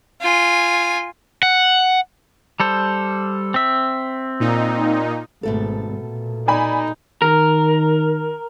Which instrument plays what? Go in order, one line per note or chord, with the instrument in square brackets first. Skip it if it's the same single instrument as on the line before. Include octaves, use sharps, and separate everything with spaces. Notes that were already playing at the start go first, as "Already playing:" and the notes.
[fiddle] F4 G#5
[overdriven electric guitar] F#5
[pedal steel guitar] G3 A4 C5
C4 E5
[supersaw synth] A#2 D#4
[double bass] G#1 [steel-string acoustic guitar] B2 A3 A4
[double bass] A#2
[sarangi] D#4 [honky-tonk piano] D5 G#5 B5
[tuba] D#3 [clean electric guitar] A#4